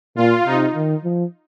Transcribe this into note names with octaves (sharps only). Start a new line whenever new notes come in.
A#2 F4
C3 D#4
D#3
F3